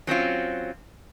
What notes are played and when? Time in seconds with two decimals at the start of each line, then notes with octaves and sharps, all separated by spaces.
0.07 F#3 C4 C#4 F4